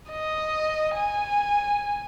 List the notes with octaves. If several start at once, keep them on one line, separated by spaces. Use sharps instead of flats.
D#5
G#5